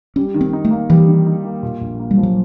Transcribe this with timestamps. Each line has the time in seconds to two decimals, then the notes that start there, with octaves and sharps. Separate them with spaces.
0.16 G3 C#4
0.34 D#3
0.41 C4
0.53 D#4
0.65 A3
0.71 A#3
0.90 E3 G3
1.08 D#3
1.26 D#4
1.44 A#3
1.63 A#2
1.81 A#1
1.99 A#3
2.11 G3
2.17 F3
2.23 F#3